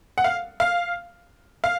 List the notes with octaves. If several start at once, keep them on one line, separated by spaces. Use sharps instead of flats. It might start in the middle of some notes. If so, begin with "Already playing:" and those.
F#5
F5
F5
F5